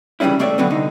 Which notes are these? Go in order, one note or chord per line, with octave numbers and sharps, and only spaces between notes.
C#3 E3 F#3 G3 C#4 E4
B1 A3 C4 C#5 D5 E5
B2 D3 F#3 B3 C4
C2 D3 D#4